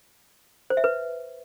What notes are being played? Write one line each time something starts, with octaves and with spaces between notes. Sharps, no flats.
C5
E5
B4